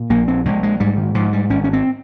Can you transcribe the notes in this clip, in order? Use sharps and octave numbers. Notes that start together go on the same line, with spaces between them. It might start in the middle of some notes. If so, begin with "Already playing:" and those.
Already playing: A#2
A#1 A#3
C4
A#1 G#3
G#3
G#2 G3
D#3
G#2 F3
G3
G#1 C#4
C#4
C4